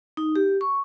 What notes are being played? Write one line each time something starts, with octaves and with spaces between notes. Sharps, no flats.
D#4
G4
C#6